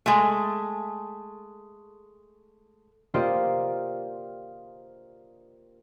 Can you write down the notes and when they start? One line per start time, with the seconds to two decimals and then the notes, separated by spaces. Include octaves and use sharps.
0.06 G#3 A3
3.14 A#3 F4 G4 C5 D5 D#5